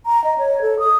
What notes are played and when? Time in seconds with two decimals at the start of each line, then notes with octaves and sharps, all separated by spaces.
0.06 A#5
0.24 D#5
0.38 C#5
0.62 A4
0.79 D#6